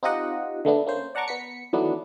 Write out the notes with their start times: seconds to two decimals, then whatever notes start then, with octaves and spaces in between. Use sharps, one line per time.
0.03 C4 D#4 F4 G4 D#5 F#5
0.65 D3 A3 B3 D4
0.87 A#3 C#4 C5
1.15 D5 F#5 A5 A#5 C#6 D6
1.28 B3 B6 C#7
1.73 D#3 E3 F#3 A3 B3 D4